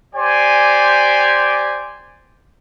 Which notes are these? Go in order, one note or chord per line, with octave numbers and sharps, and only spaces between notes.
G4 C5 D5 G#5